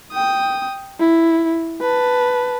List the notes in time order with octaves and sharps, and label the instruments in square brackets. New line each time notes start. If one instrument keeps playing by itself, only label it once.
[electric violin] G5 D#6
E4
B4 A5